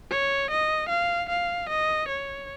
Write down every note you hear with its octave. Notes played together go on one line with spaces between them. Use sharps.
C#5
D#5
F5
F5
D#5
C#5